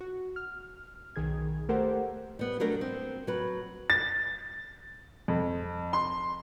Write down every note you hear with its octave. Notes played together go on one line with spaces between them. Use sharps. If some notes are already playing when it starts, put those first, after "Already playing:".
F#4
F6
B1 D#3 G#4 G#6
A3 G4 A4 A#4 C5 F#5
G3 B3
F#3 G3 A3 D4 A4 A#4
C4
F#3 B4
A6
F2
C6